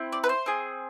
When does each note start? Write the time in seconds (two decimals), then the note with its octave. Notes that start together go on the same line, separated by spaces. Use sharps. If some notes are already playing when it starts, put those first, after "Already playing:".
Already playing: C4 E4
0.12 D5
0.24 B4
0.29 C5
0.46 C4 G#4